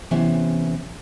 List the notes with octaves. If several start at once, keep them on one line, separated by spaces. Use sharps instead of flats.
C3 E3 B3 C#4 C5 E5